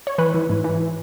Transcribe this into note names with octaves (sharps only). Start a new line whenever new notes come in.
C#5
E3 B4
E3
G#2
E3